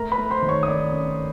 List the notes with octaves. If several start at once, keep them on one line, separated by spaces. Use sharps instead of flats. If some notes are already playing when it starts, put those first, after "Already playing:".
Already playing: A3 A#4 A#5
B4 B5
A3
C5 C6
D#3
C#5 C#6
D#6
D#3 D5 D6
C#4